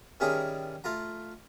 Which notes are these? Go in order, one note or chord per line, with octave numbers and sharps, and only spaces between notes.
D#3 G3 C#4 E4 G#4 A#4
A3 F4 A#5